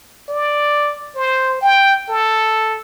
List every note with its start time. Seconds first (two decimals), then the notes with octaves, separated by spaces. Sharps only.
0.29 D5
1.15 C5
1.61 G5
2.09 A4